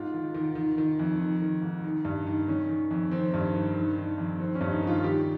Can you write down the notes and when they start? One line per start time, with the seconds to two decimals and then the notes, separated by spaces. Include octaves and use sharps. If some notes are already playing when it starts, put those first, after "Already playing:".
Already playing: G#2 F4
0.14 D#3
0.34 D#3
0.55 D#3
0.78 D#3
0.99 F2
1.19 D#3
1.42 D#3
1.62 G#2
1.84 D#3
2.05 G2
2.27 D#3
2.48 D#3 C#4
2.69 D#3
2.91 F2
3.12 D#3 C4
3.34 G2
3.54 D#3
3.76 D#3
3.98 D#3
4.18 F2
4.40 D#3 C4
4.55 C#4
4.61 G2
4.72 D#4
4.83 D#3 F4
5.03 D#3 G4